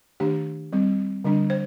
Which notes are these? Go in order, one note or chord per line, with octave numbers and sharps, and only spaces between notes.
D#3 A3 D4 G4
G3 C4
D3 G3 D4
C5